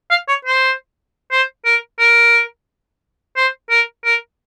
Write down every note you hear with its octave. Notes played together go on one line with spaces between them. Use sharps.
F5
C#5
C5
C5
A#4
A#4
C5
A#4
A#4